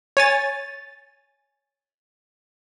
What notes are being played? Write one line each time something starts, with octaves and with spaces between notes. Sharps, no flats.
C#5 G#5 A6